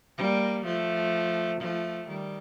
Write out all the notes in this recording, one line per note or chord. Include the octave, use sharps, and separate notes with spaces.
G3 A#3
F3 A3
F3 A3
D#3 G3